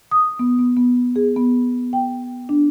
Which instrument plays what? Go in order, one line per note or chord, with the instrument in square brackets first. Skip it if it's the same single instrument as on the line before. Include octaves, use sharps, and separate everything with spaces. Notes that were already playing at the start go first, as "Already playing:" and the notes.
[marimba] D#6
B3
B3
B3
G#4
B3
G5
D4